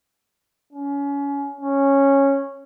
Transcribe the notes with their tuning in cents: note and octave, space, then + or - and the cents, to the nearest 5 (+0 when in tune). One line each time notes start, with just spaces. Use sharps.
C#4 +25
C#4 -10